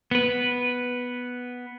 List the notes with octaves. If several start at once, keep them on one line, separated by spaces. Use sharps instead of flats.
B3 B4